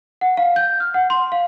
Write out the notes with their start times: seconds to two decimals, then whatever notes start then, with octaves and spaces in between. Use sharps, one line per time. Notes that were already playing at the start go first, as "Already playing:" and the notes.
0.21 F#5
0.37 F5
0.56 G6
0.80 F6
0.94 F#5
1.10 C6
1.32 F5